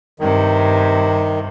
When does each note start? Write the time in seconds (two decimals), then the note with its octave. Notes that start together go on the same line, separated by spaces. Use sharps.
0.19 G2 C3 D#3